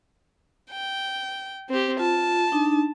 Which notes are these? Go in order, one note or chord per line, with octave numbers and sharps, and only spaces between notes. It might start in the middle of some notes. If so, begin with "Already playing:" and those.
G5
C4 G4
F4 A5
D4 D#4